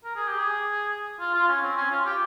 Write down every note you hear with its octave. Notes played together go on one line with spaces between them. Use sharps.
A#4
G#4
G4
G#4
F4
F4
C#4
C4
C#4
F4
F4
G4